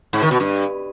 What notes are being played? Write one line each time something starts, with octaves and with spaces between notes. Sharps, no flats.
G#2
D#3
B2
G2